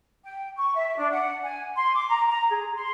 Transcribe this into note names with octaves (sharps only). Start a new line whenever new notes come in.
G5
C#6
E5
D4
F#5
G#5
C6
D6
A#5
A#5
G#4
C6